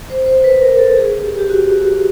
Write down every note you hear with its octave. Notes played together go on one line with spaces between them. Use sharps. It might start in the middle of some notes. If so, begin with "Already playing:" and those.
C5
C5
B4
A#4
A4
G#4
G4
G4
F#4